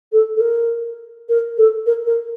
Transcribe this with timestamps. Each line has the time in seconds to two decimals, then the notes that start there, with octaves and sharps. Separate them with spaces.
0.12 A4
0.36 A4
0.40 A#4
1.29 A#4
1.58 A4
1.86 A#4
2.06 A#4